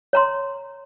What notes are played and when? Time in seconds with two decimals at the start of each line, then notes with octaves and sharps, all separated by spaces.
0.13 C#5 A#5 C6